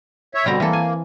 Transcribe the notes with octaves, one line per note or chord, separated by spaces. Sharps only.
C#5 E5
B2 D3 G3 C4 A#5
E3 A#3 A4
G#5